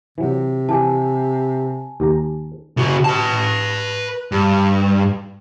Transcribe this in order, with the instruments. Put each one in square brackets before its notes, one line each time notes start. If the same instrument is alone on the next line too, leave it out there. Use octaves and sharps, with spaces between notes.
[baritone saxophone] C3 [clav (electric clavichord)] E3 F#3
[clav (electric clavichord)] E3 G4 [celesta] G#5 A5
[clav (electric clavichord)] D#2 G4 A#5
[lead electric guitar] C#3 F#4
B4 A5
G2